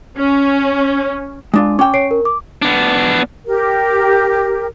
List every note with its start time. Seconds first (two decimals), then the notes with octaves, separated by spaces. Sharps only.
0.18 C#4
1.54 G#3 D4 F4
1.79 C#4 G5 D6
1.94 C#5 C7 D7
2.11 A#4
2.25 D6
2.62 B3 D4
3.46 G4 A#4